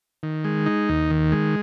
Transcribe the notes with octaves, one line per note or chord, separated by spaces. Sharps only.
D#3
G#3
D#4
D#2
D#3
G#3